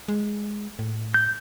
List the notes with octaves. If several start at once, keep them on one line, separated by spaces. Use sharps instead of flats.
G#3
A2
G6